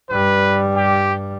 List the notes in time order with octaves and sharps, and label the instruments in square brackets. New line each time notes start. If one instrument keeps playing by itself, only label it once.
[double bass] G2 G3 [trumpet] B4
[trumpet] G4